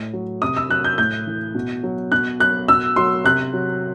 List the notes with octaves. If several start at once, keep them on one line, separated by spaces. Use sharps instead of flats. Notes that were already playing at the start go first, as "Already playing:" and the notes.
Already playing: A2
F#3
C3 D#6
E6
F#3 F#6
G6
A2 G6
E3
B2
F#3
B2 F#6
F#3 F#6
B2 E6
F#3 C6
C3 F#6
F#3